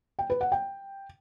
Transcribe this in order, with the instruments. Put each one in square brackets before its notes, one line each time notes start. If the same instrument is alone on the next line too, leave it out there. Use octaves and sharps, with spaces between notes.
[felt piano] G5
B4
F#5
G5